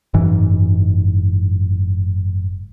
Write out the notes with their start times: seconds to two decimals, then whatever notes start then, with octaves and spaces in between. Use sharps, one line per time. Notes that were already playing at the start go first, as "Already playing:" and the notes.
0.14 F#1 G#2 E3